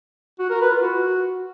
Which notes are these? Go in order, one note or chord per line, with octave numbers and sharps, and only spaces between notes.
F#4
A#4
B4
F4
F#4